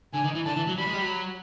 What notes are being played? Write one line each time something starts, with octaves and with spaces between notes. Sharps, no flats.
D3 G#5
D#3
E3
D3 A5
E3
F#3
G3 B5
G#3
G3
F#3